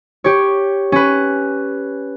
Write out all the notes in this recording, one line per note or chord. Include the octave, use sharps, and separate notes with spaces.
G4 C#5
C#4 B4